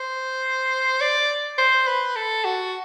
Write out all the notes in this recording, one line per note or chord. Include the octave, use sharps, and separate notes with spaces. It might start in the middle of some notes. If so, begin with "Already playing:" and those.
Already playing: C5
D5
C5
B4
A4
F#4